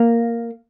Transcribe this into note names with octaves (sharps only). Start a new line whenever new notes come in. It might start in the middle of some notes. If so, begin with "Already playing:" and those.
Already playing: A#3